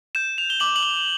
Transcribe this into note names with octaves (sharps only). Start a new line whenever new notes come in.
G6 E7
F7
G7
D6 F#7
F#7
G7